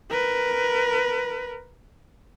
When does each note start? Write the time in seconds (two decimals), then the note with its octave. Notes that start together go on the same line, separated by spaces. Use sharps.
0.10 A#4 B4